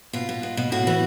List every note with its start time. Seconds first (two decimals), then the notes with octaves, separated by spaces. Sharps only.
0.13 B2 F4
0.29 B2
0.43 B2
0.57 B2
0.72 A2 F#4
0.87 E3